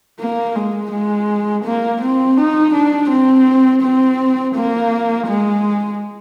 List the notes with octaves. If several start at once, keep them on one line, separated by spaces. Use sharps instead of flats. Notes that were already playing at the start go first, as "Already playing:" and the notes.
A#3
G#3
G#3
A#3
C4
D#4
D4
C4
C4
A#3
G#3